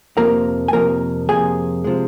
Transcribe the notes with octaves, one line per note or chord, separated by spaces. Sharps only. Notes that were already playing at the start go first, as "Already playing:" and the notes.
F2 C3 F3 A#3 A#4 A#5
G#5
F2 C3 F3 A#3 A#4 A#5
F2 C3 F3 A#3 G#4 G#5
C3 F3 G#3